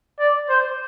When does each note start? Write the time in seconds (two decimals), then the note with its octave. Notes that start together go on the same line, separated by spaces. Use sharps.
0.19 D5
0.49 C5